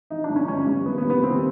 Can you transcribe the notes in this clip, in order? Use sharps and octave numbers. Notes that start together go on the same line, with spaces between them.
E3 D#4
D4
G1
C#4
G1 C#4
G2
D#2 B3
B3
D#2
B3
D#2 C4